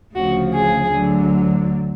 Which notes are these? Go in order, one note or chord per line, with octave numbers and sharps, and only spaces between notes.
D2 C#3 F3 F#4
G#4
D2 D3 F#3